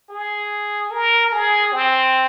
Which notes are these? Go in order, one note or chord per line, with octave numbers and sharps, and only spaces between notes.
G#4
A#4
G#4
C4